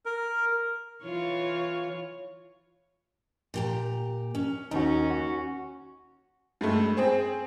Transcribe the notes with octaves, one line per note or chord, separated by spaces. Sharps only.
A#4
E3 F4 C#5
A#2 G4 A#5
C#4
D#2 C#4 D#4 F#4
F#4
G2 G#3 A3
C4 G#4 C5